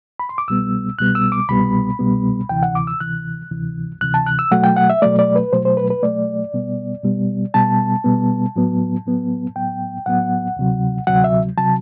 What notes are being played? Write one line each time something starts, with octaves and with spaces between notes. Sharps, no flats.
B5
C6
D6
C2 B2 G3 B3 E6
C2 B2 G3 B3 F#6
E6
D6
C2 B2 G3 B3 B5
C2 B2 G3 B3
D2 C3 E3 G5
F#5
D6
E6
D2 C3 E3 F#6
D2 C3 E3
D2 C3 E3 F#6
A5
F#6
E6
B2 F#3 A3 F#5
G5
F#5
E5
B2 F#3 A3 D5
D5
B4
B2 F#3 A3 C5
C5
B4
B4
B2 F#3 A3 D5
B2 G3 B3
B2 G3 B3
B2 G3 B3 A5
B2 G3 B3
A2 F#3 B3
A2 F#3 B3
A2 F#3 B3 G5
A2 F#3 B3 F#5
D2 C3 F#3
D2 C3 F#3 F#5
E5
C3 F#3 A5